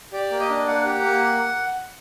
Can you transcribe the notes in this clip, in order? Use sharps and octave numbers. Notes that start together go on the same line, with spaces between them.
G4 D5
A#3
D#5
D4
A#3 F#5
G4
A#3